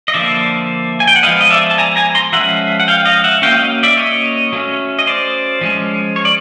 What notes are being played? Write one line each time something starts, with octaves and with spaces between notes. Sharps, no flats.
D#5
D3 F3 A#3 D5 E5
G#5
G5
F#5
F3 G#3 B3 D#5 F5
D#5
D5 E5
A5
G#5 A#5
G#5 A#5
A#5 C6
F3 G#3 C#4 E5 F#5
F#5
F5 G5
D#5 F5
E5 F#5
F#3 A#3 C#4 F5 G5
D#5 F5
D5 E5
C#5 D#5
F#3 A3 C#4
D#5
C5 D5
F3 G#3 C#4
C#5
D5